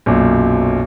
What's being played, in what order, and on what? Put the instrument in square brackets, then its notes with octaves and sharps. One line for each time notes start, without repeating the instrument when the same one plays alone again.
[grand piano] B1 F#2 A#2